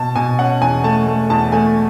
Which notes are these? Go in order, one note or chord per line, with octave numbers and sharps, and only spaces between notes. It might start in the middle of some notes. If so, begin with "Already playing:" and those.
Already playing: B2 A5
B2 G#5
C#4 F#5
E2 G#5
A3 A5
A3
E2 A5
A3 G#5